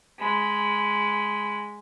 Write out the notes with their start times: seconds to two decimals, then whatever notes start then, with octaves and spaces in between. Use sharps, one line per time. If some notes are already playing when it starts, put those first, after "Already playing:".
0.19 G#3 B5